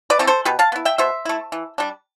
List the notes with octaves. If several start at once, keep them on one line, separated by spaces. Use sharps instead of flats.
B4 D5
E3 A3 C4
A4 C5
B2 G4 B4
F5 A5
B3 E4
E5 G5
B2 C5 E5
A3 E4
E3
G3 D4